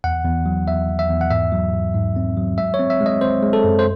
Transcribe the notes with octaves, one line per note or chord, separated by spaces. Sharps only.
E2 F#5
E2
F#3
E2 E5
E2
E5
E2
F#5
G#2 E5
F#3
G#2
G#2
C4
F#3
G#3 E5
C#5
C4
E5
G#3
D#5
C4 C5
G#3
A4
F#2
C5